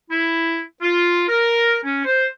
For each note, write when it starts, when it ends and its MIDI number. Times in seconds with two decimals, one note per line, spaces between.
0.10 0.62 64
0.82 1.24 65
1.28 1.79 70
1.84 2.02 61
2.05 2.26 72